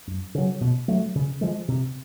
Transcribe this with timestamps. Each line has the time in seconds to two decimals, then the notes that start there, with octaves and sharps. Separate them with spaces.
0.07 F#2
0.35 C#3 F#3
0.61 B2
0.88 F#3 A3
1.15 C#3
1.41 F3 G#3
1.68 C3